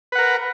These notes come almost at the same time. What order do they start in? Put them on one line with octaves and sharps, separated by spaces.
B4 F#5 A#4